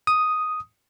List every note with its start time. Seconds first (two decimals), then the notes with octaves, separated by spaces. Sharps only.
0.07 D#6